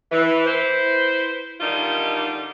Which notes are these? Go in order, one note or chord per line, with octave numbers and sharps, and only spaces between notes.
E3
E4 B4 C5
D3 D#3 G3 D#4 F4